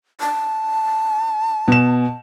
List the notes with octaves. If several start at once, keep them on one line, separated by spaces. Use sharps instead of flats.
A5
B2 E7